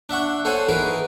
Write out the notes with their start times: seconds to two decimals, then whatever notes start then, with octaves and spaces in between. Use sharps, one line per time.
0.09 D4 E5 F#5 C#6
0.45 A4 C5 C#5 F#5 G#5
0.69 E3 D#4 G#4 A#4 B4